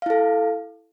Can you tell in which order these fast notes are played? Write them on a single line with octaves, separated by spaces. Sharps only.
F5 E4 A4